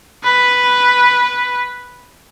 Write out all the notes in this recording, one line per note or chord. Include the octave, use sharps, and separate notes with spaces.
B4